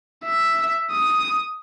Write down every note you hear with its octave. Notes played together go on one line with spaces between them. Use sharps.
E5
D#6